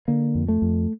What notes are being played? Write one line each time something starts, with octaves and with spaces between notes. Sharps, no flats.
D3 A#3
F2
A3
F2